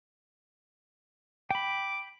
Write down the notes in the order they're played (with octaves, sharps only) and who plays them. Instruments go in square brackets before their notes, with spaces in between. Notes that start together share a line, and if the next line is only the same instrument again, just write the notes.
[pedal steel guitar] G5 B5 [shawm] D6